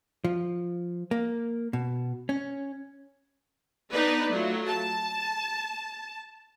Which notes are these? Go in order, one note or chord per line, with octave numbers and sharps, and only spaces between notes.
F3
A#3
B2
C#4
B3 D4 D#4 B4 D5
F#3 A3 F4
A5